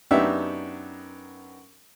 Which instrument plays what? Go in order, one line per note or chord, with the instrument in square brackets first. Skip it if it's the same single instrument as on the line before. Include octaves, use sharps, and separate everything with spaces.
[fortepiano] F#2 B3 D4 D#4 G4 E5